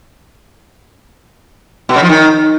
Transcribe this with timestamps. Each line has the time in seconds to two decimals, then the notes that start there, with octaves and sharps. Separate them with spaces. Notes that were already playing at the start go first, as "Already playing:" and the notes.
1.89 B2
1.96 C#3
2.03 F3
2.09 D#3